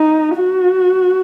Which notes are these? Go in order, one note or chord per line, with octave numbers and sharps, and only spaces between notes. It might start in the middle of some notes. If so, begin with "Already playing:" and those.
Already playing: D#4
F#4